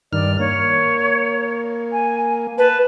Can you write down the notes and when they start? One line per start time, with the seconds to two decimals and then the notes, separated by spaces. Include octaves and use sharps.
0.13 G2 D#3 D5 F6
0.39 A#3 C#5
1.92 G#5
2.58 B4 A5